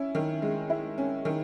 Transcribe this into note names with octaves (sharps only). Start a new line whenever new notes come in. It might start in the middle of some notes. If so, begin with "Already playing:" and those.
Already playing: C#4 E4
D#3
G#3
E4
C#4
D#3